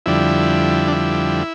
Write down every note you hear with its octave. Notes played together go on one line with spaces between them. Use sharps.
F2 D3 G3 E4
D4
E4